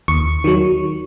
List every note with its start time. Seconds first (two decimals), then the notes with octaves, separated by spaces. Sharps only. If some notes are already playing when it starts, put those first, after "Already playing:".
0.08 D#2 C#6
0.44 D#3 F#3